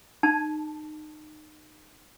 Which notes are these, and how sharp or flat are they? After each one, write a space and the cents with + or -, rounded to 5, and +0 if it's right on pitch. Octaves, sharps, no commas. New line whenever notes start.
D#4 -25 A5 +0